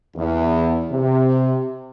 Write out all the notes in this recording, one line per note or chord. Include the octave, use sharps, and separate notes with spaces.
E2
C3